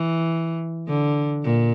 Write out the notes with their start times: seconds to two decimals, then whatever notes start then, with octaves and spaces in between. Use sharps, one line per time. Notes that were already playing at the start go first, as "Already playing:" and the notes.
Already playing: E3
0.88 D3
1.44 A#2